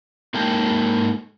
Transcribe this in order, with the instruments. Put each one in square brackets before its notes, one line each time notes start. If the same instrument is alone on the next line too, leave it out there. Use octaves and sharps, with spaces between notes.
[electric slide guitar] G#3 A#3 D#4 A4 G5